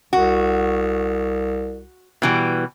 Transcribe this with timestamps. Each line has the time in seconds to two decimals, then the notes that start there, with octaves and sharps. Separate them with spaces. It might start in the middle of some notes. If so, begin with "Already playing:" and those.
0.13 C2 F#4
2.22 B2 E3 G3